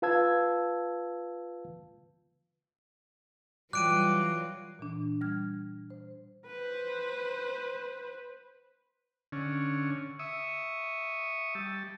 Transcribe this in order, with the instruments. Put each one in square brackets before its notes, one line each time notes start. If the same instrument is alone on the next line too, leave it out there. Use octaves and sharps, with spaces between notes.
[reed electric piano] F4 B4 F5 A5 E6 G#6
[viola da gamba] E3 F#3 F4 [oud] G3 [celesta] D6 [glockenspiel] F#6 D7 D#7
[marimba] A#2 E3 D4
G3 F6 G#6
C5
[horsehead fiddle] B4 C5
[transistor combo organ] D3 C#4
E5 C#6 D#6
G3 A5